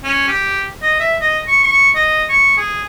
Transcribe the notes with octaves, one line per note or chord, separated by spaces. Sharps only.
C#4
G4
D#5
E5
D#5
C#6
C#6
D#5
C#6
G#4